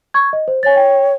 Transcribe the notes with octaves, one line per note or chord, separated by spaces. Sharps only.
C#6 G#6
D#5
C5
C#5 G#5 A6
G5